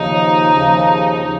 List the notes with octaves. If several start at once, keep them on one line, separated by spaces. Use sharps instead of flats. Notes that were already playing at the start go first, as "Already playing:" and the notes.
Already playing: D#2 C#3 F3 D#4
D#2 C#3 F3
F3